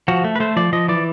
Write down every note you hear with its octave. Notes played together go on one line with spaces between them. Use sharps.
F3 F#4
A3
B4
A3 C5
F3 D5
F3 D#5
E3 D5